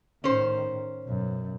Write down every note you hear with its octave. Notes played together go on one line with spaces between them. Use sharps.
A2 D#3 C#4 C5
F#2 B2